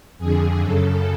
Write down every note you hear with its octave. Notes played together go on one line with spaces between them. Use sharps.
F2 D3 G#4
F#2 C#3 A4